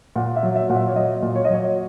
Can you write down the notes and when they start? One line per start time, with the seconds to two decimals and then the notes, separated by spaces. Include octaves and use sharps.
0.16 A#2 F#5
0.36 E5
0.43 F#3
0.55 E5
0.69 A#2 F#5
0.76 E5
0.88 C#5
0.96 F#3 D#5
1.23 A#2
1.36 C#5
1.45 D#5
1.49 F#3 C#5